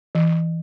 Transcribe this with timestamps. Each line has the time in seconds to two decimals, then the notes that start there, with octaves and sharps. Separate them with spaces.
0.15 E3